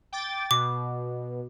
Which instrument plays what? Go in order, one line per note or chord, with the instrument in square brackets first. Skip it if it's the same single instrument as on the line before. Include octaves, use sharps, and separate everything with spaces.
[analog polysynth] G5 D6 A6
[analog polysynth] B2 [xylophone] D6